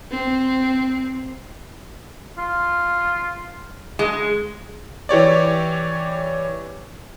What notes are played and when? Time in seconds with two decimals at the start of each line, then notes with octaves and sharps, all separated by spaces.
0.12 C4
2.38 F4
3.99 G#3
5.09 E3 G4 C#5 D5